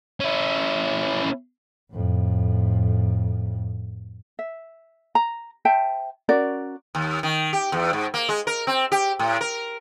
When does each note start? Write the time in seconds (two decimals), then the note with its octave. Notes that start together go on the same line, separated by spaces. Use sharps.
0.20 C#4 E4
1.91 F2 A2
4.39 E5
5.15 A#5
5.65 C5 E5 G5 A5
6.29 C#4 F#4 A#4 D5
6.95 D#2
7.23 D#3
7.53 G4
7.72 E2
7.93 G#2
8.14 A#3
8.29 G#3
8.47 A#4
8.67 C4
8.92 G4
9.19 A2
9.41 A#4